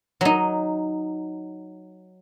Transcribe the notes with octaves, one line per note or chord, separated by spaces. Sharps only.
F#3 D#4